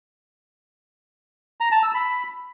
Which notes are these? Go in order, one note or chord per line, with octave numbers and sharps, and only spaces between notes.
A#5
A5
E6
B5